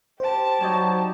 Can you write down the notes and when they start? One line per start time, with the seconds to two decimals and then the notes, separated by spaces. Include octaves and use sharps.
0.20 G4 C5 A5
0.61 F#3 D#4 C#5 D5